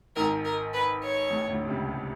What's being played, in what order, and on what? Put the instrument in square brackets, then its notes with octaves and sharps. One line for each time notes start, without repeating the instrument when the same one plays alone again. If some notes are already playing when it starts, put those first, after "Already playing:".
[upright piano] G#1 G#2 [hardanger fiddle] A#4
[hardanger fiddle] A#4
B4
C#5
[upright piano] A1 A2
D2 D3
C3
C#2 C#3
C2 C3